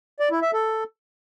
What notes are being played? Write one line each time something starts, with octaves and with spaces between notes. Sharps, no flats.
D5
E4
E5
A4